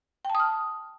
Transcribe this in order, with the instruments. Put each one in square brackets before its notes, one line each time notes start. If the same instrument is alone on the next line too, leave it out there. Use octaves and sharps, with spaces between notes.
[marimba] G5
A5
D#6
F6